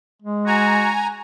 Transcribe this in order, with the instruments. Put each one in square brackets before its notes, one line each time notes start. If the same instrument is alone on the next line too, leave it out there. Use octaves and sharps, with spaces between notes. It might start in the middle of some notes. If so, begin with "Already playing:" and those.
[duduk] G#3
[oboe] F#4 [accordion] G#5 A#5